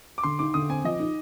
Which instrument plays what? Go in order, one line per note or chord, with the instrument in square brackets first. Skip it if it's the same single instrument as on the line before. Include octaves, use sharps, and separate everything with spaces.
[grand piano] D6
[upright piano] D3 [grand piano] C6
[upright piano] D#4 [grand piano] D6
[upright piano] D3 [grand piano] D#6
[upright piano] C4 [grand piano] G#5
[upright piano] F3 [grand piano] D#5
[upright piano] D#4